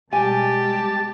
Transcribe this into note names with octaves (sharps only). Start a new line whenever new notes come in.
B2 G3 G#3 G4 G#5 A5